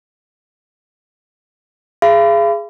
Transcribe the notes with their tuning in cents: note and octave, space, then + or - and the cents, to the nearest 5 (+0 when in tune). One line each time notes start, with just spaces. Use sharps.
G#4 +0 F5 -45 B5 +35